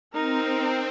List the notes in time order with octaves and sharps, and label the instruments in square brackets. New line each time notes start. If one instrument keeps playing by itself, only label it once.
[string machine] C4 [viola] D#4 A#4